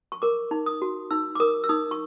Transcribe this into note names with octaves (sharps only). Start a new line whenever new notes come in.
C#6
A#4 D6
D#4
D#6
F#4
D#4 E6
D6
A#4 D#6
E6
D#4 D#6
C#6